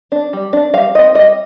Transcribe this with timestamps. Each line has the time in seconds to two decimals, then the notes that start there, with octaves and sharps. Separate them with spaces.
0.12 D4
0.33 G3
0.53 D4
0.74 G3 F5
0.95 C4 D#4 D#5
1.14 G3 D#5